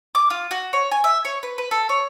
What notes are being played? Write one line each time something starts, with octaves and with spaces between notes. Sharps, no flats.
D6
F4
F#4
C#5
G#5
E5
C#5
B4
B4
A4
C#5